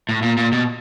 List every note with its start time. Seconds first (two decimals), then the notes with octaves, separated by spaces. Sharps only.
0.09 A2
0.22 A#2
0.37 A#2
0.52 B2